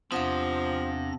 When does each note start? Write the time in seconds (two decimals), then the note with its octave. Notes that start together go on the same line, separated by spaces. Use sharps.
0.12 E2 C3 F3 D4 F5 F#5 D#6 A#6